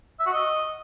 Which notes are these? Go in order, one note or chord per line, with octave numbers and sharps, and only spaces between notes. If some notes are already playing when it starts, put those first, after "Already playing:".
E5
F#4
D#5